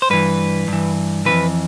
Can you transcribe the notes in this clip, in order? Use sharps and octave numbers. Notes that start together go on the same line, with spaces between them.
C5
G2 E3 B4
G2 E3
F2 C3 E3 B4